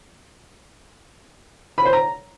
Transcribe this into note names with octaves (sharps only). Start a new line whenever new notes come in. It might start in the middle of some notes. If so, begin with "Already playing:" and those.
B5
C5
A#5